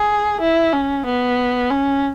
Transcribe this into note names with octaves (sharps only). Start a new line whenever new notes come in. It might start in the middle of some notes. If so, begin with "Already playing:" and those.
Already playing: G#4
E4
C#4
B3
C#4